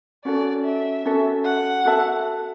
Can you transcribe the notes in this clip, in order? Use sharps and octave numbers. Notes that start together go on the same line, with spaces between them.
C#4 F#4 A4 D5
E5
C#4 F#4 A4
F#5
F#4 A4 E5 A5